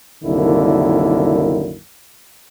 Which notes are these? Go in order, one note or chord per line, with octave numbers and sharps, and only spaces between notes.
C2 F#2 D3 D#3 A#3 E4